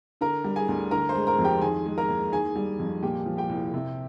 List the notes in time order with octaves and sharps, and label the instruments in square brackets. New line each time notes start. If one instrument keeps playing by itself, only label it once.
[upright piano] D3 A#4 A#5
G3
G#4 G#5
D2
D3 A#4 A#5
C5 C6
G#3
A#4 A#5
F2
G4 G5
D#3 G#4 G#5
G#3
A#4 A#5
D#2
D#3 G#4 G#5
G3
F2
A#2 G4 G5
F3
G4 G5
C2
C3